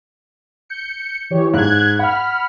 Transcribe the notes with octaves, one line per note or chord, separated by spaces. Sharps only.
G6 C#7
E3 G4 C#5
G#2 F#6 G#6
F#5 B5 F6